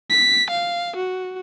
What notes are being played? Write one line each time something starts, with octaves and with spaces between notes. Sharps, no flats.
B6
F5
F#4